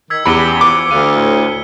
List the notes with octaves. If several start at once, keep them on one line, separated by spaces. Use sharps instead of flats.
D#3 E6 G#6 B6
E2 C#4 D4 G4 B5 C#7 D#7 G7
E3 F3 B3 D6
D2 D3 F5 D#7
A2